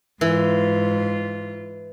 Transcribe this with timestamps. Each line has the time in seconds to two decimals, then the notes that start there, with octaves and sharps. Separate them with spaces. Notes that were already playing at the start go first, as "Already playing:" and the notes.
0.21 G#2 E3 F4